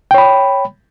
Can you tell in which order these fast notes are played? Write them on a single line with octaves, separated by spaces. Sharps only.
G5 C#5 B5